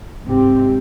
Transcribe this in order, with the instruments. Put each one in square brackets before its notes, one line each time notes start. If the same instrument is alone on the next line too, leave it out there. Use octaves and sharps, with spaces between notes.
[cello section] G#2 C3 C4 G4